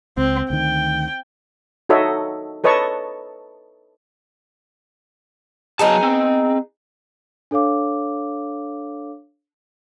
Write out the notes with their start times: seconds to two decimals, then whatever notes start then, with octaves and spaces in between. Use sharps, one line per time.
0.18 C#2 C4
0.50 D2 D#3 G5
1.89 D#4 F#4 A4 C#5 D#5 E5
2.64 A4 B4 C#5 D#5 A5 C#6
5.79 F#3 B3 D#4 G#4 A5
6.03 C4
7.51 D4 A4 C#5 F5 D6